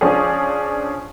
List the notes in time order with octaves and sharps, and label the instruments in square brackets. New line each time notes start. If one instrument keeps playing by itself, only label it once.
[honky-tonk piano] F3 C#4 D4 G#4